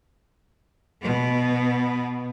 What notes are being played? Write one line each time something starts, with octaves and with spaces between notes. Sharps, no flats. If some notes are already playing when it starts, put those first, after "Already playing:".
B2 B3